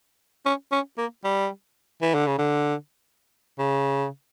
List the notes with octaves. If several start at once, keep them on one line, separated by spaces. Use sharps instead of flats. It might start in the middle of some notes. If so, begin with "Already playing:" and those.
C#4
C#4
A#3
G3
E3
D3
C#3
D3
C#3